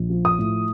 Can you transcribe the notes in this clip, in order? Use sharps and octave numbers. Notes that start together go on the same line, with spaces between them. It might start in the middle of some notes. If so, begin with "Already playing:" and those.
Already playing: A#1
F3
D#6
A2